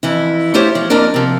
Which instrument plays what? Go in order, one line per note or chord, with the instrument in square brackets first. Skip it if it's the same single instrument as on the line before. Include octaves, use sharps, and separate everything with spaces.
[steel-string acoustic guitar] F2 E3 E4
A3 E4 F4 G4 C5 C#5
F3
F2 F3 A#3 D4 A#4
C3 F3